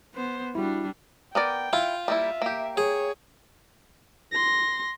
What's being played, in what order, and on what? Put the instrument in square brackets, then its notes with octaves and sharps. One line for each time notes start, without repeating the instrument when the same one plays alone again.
[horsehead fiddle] B3 C5
[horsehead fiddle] G3 D4 [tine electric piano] E4 F#4
[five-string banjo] B3 A#4 D5 [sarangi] G5
[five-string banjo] E4 [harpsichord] F4
[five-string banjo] G3 A#3 E4 [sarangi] E5
[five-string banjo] A#3 G4
[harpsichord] G#4 [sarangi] C#5
[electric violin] C6 A#6